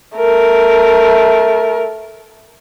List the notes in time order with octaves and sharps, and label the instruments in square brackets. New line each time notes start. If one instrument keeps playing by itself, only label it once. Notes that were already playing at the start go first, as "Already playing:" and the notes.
[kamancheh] A3 A#4